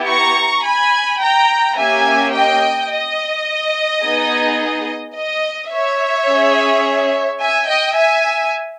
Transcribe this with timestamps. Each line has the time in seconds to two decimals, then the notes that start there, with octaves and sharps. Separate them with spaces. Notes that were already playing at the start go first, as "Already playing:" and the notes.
Already playing: B3 E4 G4
0.09 A#5 C#6
0.66 G#5 B5
1.22 G5 A#5
1.78 A#3 C#4 G4 E5 G#5
2.34 D#5 G5
2.91 D#5
4.04 B3 D#4 G#4
5.16 D#5
5.72 C#5 E5
6.28 C#4 G#4
7.41 E5 G#5
7.69 D#5 G5
7.97 E5 G#5